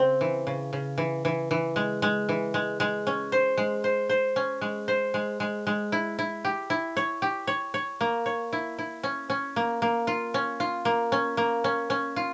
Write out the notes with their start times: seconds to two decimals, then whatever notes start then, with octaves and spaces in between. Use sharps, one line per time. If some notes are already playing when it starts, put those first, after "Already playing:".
Already playing: C#3 C4
0.21 E3
0.47 C#3
0.73 C#3
0.98 E3
1.25 E3
1.51 E3
1.76 G#3
2.02 G#3
2.29 E3
2.54 G#3
2.80 G#3
3.07 C#4
3.32 C5
3.57 G#3
3.84 C5
4.09 C5
4.36 C#4
4.61 G#3
4.88 C5
5.14 G#3
5.40 G#3
5.67 G#3
5.92 E4
6.19 E4
6.45 G4
6.70 E4
6.97 C#5
7.22 G4
7.47 C#5
7.74 C#5
8.01 A#3
8.26 C#5
8.53 E4
8.79 E4
9.03 C#4
9.30 C#4
9.56 A#3
9.82 A#3
10.07 F4
10.34 C#4
10.60 F4
10.85 A#3
11.12 C#4
11.37 A#3
11.64 C#4
11.90 C#4
12.16 F4